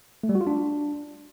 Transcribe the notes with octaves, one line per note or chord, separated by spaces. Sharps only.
A3
G3
F#4
F4
D4